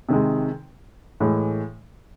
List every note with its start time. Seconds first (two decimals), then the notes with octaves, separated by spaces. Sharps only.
0.09 C3 D#3 G#3
1.20 A2 E3 G#3